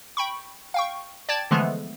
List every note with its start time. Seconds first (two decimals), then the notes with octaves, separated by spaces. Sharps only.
0.17 G5 B5 C#6
0.74 F5 G5 C#6
1.29 D5 G5 A5 G#6 A6
1.51 D3 E3 F3 G#3 A3 B3